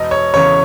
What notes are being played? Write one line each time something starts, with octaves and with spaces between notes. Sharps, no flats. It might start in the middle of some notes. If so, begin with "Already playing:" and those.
Already playing: E1 D#5
C#5
E2 C#3 C#5